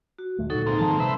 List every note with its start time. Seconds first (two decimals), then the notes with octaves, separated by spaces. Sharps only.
0.19 F#4
0.38 D#1 D#2 A3
0.50 D2 A#2 F#3 D#4 A4
0.66 G#2 A#3 C4
0.79 D#3 F3 A5 A#5
1.00 C3 G3 C4 B4 C5 E5